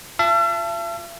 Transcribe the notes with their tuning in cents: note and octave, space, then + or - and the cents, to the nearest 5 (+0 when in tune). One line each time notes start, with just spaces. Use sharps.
F4 +10 E5 +45 A5 +0